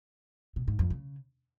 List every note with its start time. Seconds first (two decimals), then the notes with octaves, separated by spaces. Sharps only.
0.56 B2
0.68 G#2
0.79 F2
0.90 C#3